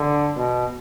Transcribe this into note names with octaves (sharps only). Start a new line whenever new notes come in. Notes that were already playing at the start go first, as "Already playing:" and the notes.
Already playing: D3
B2